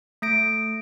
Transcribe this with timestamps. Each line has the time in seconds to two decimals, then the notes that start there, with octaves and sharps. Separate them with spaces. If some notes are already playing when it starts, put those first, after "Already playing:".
0.22 A3 A#6 D7